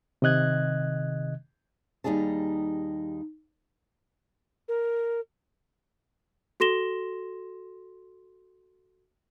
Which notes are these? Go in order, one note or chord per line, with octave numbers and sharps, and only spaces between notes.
C3 D#3 D#5 F#6 G#6
D#2 C#3 G3 D#4 G#4 A5
A#4
F#4 A4 C6 A#6 E7 G7